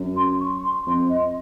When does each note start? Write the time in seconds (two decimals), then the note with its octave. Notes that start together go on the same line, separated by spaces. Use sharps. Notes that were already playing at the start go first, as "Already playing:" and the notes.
Already playing: F#2
0.16 C6
0.40 C#6
0.63 C6
0.87 F2 C6
1.09 D#5